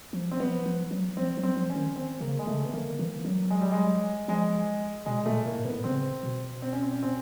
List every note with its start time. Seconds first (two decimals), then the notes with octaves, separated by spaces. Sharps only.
0.13 F3
0.31 C4
0.40 F3 B3
0.66 F3
0.91 F#3
1.17 F3 C4
1.37 F#3
1.43 C4
1.57 F3
1.70 C#4
1.76 D#3
1.96 C4
2.21 C#3 A#3
2.39 G#3
2.47 C#3 A3
2.65 B3
2.73 D3 A#3
2.99 E3
3.25 F#3
3.50 G#3
3.61 G3
3.72 G#3
4.28 F3 G#3
5.06 B2 G#3
5.26 A#2 A3
5.45 A2 A#3
5.65 A2 B3
5.84 C#3 C4
6.23 B2
6.62 C4
6.73 C#4
6.83 C4
6.92 C#4
7.03 C4